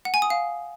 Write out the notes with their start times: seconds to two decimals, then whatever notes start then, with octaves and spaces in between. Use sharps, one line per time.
0.05 F#5
0.14 G#5
0.22 D#6
0.30 F5